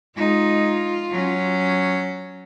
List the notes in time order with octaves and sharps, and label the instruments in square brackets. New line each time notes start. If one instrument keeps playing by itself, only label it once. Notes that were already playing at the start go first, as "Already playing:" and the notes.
[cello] G#3 D#4 [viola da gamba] F4
[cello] F#3 C#4